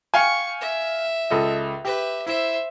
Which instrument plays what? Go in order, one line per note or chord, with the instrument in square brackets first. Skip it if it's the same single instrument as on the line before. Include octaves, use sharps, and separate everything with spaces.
[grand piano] F5 G5 G#5 [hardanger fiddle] C#6
[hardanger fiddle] E5
[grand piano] C#2 A4 D#5
[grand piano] G4 [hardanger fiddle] B4 E5
[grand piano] E4 [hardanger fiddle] C5 E5